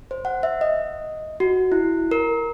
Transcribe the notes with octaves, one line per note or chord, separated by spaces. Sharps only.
C5
F#5
E5
D#5
F#4
E4
A#4